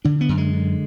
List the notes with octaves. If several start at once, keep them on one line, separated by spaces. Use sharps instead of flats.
D3 D4
B3
F#2
G#3
D3